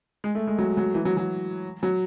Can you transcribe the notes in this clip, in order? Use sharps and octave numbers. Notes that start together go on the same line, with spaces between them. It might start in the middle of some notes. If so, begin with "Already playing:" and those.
G#3
A3
G#3
F#3
F#3
E3
F#3
F#3
F#3